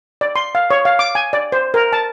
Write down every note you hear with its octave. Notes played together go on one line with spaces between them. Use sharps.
D5
C6
F5
C#5
F5
D6
G#5
D5
C5
A#4
A5